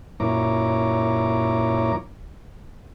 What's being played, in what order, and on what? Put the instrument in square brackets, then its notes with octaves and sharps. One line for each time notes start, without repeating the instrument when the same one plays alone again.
[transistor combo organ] F#2 A#2 E4 C#5 A#5 D6